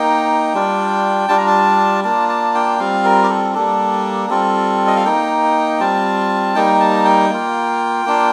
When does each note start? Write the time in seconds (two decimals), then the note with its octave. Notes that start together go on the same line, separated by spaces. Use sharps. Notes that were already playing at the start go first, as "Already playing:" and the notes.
Already playing: A#3 D#4 G5
0.54 G3 D4 F4
1.29 G3 D4 F4 A5
1.38 A#5
1.47 A5
2.04 A#3 D4 F4 A5
2.29 A5
2.55 G5
2.79 G3 C4 F4 F5
3.05 A#4
3.23 G4
3.29 A4
3.54 G3 A#3 D4 A4
4.30 G3 C4 F4 A4
4.87 D#5
4.96 F5
5.05 A#3 D#4 G5
5.80 G3 C4 F4 A5
6.55 G3 A#3 D#4 G5
6.80 A5
7.05 G5
7.30 A#3 F4
8.05 A#3 D4 F4